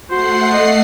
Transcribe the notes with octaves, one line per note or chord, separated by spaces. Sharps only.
A3 F#4 C5 F#5 C7
D#5